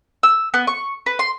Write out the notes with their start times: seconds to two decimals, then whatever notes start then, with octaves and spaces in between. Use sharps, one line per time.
0.23 E6
0.54 B3
0.67 C#6
1.06 B4
1.19 C6